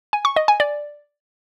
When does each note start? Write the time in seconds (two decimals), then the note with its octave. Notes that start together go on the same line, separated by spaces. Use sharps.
0.13 G#5
0.25 C#6
0.36 D#5
0.48 G#5
0.60 D5